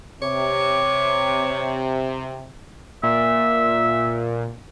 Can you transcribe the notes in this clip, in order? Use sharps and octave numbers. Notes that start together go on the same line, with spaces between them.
C3 C#5 D6
A#2 E5